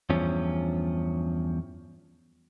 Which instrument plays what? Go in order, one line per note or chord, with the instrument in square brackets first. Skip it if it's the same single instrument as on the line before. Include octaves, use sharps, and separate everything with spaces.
[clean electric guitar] E2 G2 F3 C#4